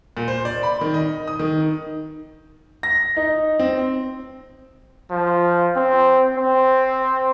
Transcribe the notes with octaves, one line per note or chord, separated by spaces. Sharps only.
A#2
C5
D5
B5
D#3
D#5
D#6
D#3
A#6
D#4
C4
F3
C4
C4